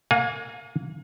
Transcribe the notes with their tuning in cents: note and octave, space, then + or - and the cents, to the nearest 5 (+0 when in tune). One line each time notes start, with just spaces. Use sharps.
A#3 -25 F5 +40 G#5 +0